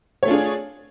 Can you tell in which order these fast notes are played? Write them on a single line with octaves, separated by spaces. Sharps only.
C#5 A3 F4 D4 G#4